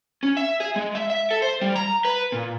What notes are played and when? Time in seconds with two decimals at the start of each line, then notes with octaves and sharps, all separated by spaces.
0.23 C#4
0.37 E5
0.60 G#4
0.76 G#3
0.95 E5
1.10 E5
1.31 A4
1.42 C5
1.61 G3
1.76 A#5
2.05 B4
2.32 A#2